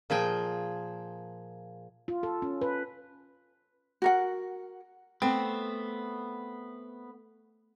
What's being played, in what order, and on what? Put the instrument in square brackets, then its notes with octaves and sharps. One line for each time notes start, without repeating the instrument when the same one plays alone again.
[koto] A#2 F3 G#4 G5
[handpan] F4
A4
C#4
B4
[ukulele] F#4 A#4 F#5
[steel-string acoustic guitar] A3 [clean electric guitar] B3 [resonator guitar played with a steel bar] C4 [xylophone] G5